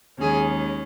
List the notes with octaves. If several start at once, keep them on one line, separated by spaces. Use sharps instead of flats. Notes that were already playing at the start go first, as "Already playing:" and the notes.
D#2 D#3 G#3 C#4 G#4